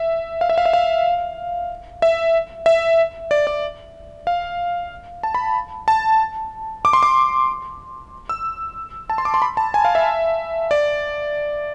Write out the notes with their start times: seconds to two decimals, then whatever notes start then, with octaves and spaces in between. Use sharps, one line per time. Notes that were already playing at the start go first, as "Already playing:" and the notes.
Already playing: E5
0.41 F5
0.50 E5
0.58 F5
0.66 E5
0.73 F5
2.02 E5
2.66 E5
3.31 D5
3.47 D5
4.27 F5
5.23 A5
5.34 B5
5.88 A5
6.85 D6
6.93 C6
7.03 D6
8.29 E6
9.10 A5
9.18 C6
9.25 D6
9.34 C6
9.42 B5
9.57 A5
9.74 G#5
9.85 F5
9.95 E5
10.71 D5